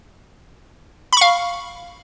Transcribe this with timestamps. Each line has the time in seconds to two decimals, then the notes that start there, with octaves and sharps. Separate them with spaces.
1.13 B5
1.17 C#6
1.21 F5